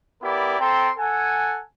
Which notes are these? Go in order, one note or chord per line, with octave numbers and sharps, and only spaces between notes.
B3 E4 G4 A#4 D5
C4 A4 G5 A#5 C6
A4 F#5 G#5